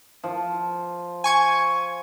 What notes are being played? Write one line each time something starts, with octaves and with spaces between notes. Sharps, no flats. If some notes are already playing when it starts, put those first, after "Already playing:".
F3
G#5 C#6 G#6